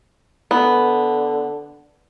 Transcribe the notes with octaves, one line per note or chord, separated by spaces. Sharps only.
D3 B3